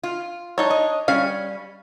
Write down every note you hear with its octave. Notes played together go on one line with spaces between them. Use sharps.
F4
D4 D#4 C#5
D#5
G3 C#4 F5